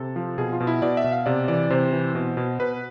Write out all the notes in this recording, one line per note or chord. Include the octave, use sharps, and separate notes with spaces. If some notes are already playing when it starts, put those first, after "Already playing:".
Already playing: C3 A4
F3
B2 G#4
F4
B2
E4
B2 D5
E5
B2
F5
C3 D5
E3 D5
C3 C5
E3
B2
B2
B2 B4